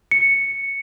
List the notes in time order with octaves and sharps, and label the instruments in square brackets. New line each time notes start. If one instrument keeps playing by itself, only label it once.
[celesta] C#7